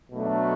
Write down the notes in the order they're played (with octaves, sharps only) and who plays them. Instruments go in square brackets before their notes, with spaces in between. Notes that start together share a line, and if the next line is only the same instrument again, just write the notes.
[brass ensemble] B2 F#3 A3 D4